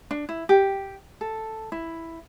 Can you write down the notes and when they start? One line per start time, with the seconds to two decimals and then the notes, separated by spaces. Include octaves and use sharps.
0.11 D4
0.29 E4
0.49 G4
1.21 A4
1.72 E4